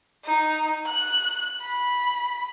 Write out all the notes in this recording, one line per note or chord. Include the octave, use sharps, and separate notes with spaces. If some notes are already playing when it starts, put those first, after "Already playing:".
D#4
F#6
B5